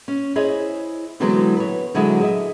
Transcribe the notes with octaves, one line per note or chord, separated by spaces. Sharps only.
C#4
E4 G#4 C5 C#5 D#5
D3 E3 F#3 G#3 B3 C4
B4 C#5
D3 F#3 G#3 E4 G#4
G#4 D#5 E5